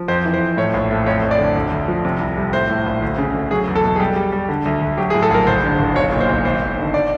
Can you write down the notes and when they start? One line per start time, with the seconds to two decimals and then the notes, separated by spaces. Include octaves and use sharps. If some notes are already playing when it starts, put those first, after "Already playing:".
Already playing: F3
0.08 F2 C5
0.25 E3
0.34 C5
0.41 F2
0.57 A2 C#5
0.74 A#1
0.91 A2
1.06 F2 C#5
1.23 F2
1.31 D5
1.39 D3
1.55 D2
1.71 D2
1.88 F3
2.05 C3
2.20 C2
2.37 G3
2.53 A2 C5
2.70 A2
2.86 A#1
3.02 D2
3.18 C#3
3.34 D2
3.51 F#3 G#4
3.67 E2
3.75 A4
3.84 B2
3.96 G#4
4.00 G3 G4
4.16 G3
4.32 G3
4.49 D3
4.65 D2
4.81 D2
4.97 F#3 G4
5.10 G#4
5.14 A2
5.23 A4
5.30 A#1 A#4
5.47 F#1 C5
5.64 D3
5.79 F#1
5.95 B1 C#5
6.12 A#2
6.20 C5
6.29 B1
6.45 G#1 C5
6.61 G#1
6.78 D3
6.94 D5